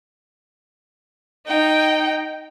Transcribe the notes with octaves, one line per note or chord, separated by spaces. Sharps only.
D#4 G5